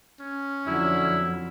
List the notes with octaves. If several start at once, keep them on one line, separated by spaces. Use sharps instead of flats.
C#4
F2 D3 F#3 E4